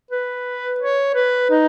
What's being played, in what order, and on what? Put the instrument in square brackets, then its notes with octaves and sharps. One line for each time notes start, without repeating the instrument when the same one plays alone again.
[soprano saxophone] B4
C#5
B4
D#4